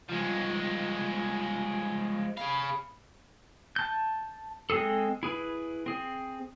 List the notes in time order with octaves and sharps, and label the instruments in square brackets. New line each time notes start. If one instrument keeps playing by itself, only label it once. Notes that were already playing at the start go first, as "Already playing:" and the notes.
[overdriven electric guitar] F3 G#3 [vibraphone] G3 F4
[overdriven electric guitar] G#4 F5 [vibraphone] B5
[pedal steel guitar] A5 G6
G#3 C4 G#4 A4
E4 G#4 B4
C4 G#4